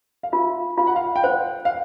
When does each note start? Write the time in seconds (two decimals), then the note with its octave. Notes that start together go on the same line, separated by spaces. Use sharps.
0.23 F5
0.32 F4 E5
0.78 F4 F5
0.87 F#5
0.96 F5
1.16 G5
1.23 C5 F#5
1.65 F5